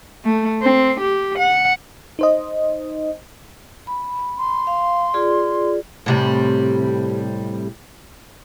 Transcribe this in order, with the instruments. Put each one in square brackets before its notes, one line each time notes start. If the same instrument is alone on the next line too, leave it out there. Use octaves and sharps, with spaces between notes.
[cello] A3
C4
G4
F#5
[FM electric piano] D#4 C5 D#5
[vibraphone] B5
[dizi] C6
[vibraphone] F5
F4 G#4 D5
[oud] A2 C3 G3